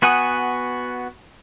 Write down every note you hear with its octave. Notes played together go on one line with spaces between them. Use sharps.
B3 F#4 F#5 G#5 D#6